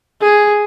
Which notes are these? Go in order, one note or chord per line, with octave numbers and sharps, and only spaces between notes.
G#4